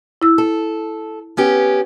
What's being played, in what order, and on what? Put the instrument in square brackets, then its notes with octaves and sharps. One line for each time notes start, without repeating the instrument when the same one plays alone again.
[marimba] E4 E6
[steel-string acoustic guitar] A4
B3 C#4 G4